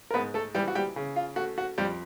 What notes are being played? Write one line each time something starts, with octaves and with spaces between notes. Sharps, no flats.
A#4
G#2 B3 B4
A3 A4
E3 G3 G4
F#4
G3 G4
C#3
F4
A3 F#4
F#4
F2 G3 G4